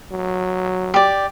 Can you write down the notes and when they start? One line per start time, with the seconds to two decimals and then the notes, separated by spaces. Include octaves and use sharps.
0.11 F#3
0.94 G4 D5